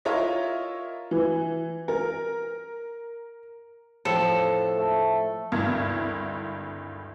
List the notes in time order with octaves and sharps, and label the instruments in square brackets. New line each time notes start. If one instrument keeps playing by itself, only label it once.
[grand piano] E4 F4 A#4 C#5 D#5 E5
[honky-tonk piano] E3
A#4
[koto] A2 F3 C4 [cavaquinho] A4
[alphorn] A3
[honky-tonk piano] G#1 D2 G2 E4 A#4 G#6